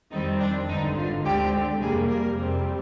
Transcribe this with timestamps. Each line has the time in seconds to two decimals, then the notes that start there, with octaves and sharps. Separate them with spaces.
0.12 F2 D#3 G3 C4 D#4
0.40 D4
0.68 G#1 G2 D3 D#4
0.97 F4
1.24 D2 D3 G#3 C4 G4
1.81 F2 C3 G3 A#3 G#4
2.09 A#4
2.37 F2 C3 G3 C4